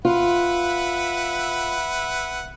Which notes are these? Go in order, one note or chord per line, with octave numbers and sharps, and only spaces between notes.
F4 B4 E5 F#5